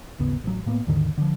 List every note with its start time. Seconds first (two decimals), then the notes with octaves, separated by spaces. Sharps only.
0.19 G#1 D#2 C#3 B3
0.44 A1 F#3
0.66 A2 A#3 B3
0.87 D#2 G#2 D3 D#3
1.18 D3 F3